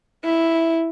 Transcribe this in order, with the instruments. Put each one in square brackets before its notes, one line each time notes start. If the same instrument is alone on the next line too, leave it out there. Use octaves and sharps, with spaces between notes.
[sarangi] E4